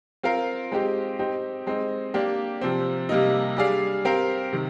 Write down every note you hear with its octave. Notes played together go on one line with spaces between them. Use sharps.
C4 F4 A#4 F5
G#3 C4 D#4 G4
C4 D#4 G4
G#3 C4 D#4
A#3 D4 G4
C3 F3 C4
C3 G3 A#3 D#4
G3 D4 G#4 D5 F5
C4 G4 A#4 F5
C3 D#3